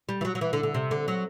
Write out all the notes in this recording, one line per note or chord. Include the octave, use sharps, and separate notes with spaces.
G3
E3
F#3
F#3
E3
D3
D3
C3
D3
F#3